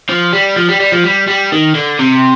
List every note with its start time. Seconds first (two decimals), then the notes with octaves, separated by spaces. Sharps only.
0.10 F3
0.33 G3
0.56 F3
0.69 G3
0.80 G3
0.92 F3
1.04 G3
1.28 G3
1.52 D#3
1.75 D3
1.99 C3